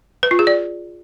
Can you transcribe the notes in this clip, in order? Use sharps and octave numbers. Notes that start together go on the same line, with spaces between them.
B4
F4
G#4
D5